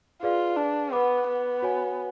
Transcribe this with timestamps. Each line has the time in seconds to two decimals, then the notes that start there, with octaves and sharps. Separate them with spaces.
0.22 F4 G#4 B4 D5 F5
0.57 D4
0.92 B3 B4 F#5 B5 D6
1.28 B3
1.62 F#4 C#5 G#5